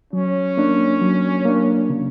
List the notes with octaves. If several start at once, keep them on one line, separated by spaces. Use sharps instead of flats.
F#3 C#4
A#3 D4
F#3
A#3 D4
C#3